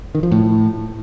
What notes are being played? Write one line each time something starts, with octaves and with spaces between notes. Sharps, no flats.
D#3
F3
A2